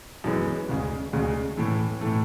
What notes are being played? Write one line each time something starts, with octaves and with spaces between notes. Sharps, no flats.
F#2 E3 G#3 B3
D2 C#3 G#3
D2 C#3 G#3
A2 E3 A3
A2 E3 A3